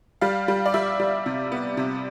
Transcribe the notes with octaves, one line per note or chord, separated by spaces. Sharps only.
G3 F5
G3
D5
G3 E5
G3
C3
B3
C3